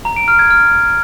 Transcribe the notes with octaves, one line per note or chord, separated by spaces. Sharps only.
A#5
D7
F6
G#6
F6